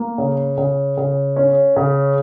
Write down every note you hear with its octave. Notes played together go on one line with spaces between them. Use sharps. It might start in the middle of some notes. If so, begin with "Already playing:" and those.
Already playing: A#3
C#3
C#3
C#3
C#4
C#3